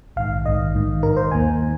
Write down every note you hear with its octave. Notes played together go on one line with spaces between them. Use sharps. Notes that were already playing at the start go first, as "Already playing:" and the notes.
A#1 G#2 D#3 F5
A#1 G#2 D#3 D#5
A#1 G#2 D#3
A#1 G#2 D#3 A#4
C5
D#2 D#3 A#3 G#5
D#3